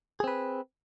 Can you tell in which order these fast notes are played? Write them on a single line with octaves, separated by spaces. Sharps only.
G#4 C4 B4